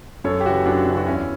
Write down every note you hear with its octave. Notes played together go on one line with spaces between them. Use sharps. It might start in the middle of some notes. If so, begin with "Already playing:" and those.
F#2 A4 C#5
G4
C#3 E3 F#4 A4
F#2 D4 F#4
C#3 E3
F#4
E2 C#4 E4